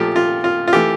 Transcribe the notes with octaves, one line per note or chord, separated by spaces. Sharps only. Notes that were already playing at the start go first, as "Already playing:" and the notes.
Already playing: A#2 F3 A3 G4
F4
F4
F4
E3 A3 G4